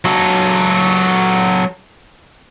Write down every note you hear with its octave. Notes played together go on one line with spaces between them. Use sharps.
F#3 A4